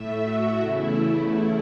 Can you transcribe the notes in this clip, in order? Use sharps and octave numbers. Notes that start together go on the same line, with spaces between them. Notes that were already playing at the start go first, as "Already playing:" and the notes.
Already playing: A2 A3 E5
F#4
E2 C#3 A3 E4